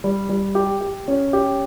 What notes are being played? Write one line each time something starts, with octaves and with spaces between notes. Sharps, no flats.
G3
G3
G4
G4
C#4
G4